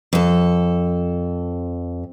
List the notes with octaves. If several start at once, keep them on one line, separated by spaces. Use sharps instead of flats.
F2 A4